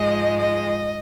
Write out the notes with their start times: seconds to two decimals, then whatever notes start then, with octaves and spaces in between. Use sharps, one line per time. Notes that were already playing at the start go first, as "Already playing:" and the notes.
Already playing: G#2 F3 G#3 D#5
0.38 D#5